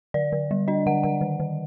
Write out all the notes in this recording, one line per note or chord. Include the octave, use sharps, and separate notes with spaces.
D3 D5
D3
G3
D4 D#5
D3 F#5
D3 F#5
D#3
D#3